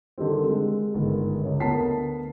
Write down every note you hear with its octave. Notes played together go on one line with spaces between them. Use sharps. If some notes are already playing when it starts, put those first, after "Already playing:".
D3 D#3 G3 C4
G#3
G1 G#2 D#3
C#2 C#5
D2 B3 A#4 A5 B6 C7